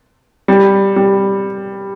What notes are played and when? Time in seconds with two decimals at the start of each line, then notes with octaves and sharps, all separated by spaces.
0.48 G3
0.96 G3